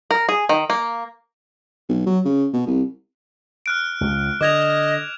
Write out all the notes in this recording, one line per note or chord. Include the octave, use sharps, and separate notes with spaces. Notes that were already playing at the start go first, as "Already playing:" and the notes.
A#4
G#4
D#3
A#3
B1
F#3
C#3
B2
C2
F6 F#6 D7
C#2
D3 D#5 D6 G#6 F7